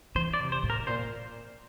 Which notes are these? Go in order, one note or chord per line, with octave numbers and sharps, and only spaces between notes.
E3 C5
D5
C3
C5
A2
A#4
A#2 C5